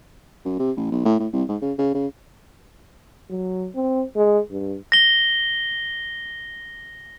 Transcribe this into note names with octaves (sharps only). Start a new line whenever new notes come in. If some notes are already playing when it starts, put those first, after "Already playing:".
F#2
C3
A1
B1
A2
A2
C2
G#2
C#3
C#3
C#3
F#3
C4
G#3
G2
A#6 G7